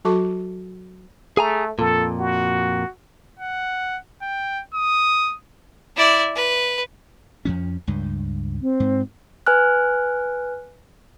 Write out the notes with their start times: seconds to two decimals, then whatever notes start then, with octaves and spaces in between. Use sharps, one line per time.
0.05 F#3 F#4 A4 A5 C#6 D6
1.37 A3 G#4 G#5 A#5
1.79 F2 A#2 A4
2.20 F#4
3.39 F#5
4.22 G5
4.74 D#6
5.97 E4 D5
6.36 B4
7.45 F2 F3 C#4
7.87 C#2 G2
8.61 C4
8.80 G#2
9.47 B4 G#5 F6 F#6